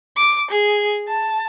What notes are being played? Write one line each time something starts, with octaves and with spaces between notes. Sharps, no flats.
D6
G#4
A5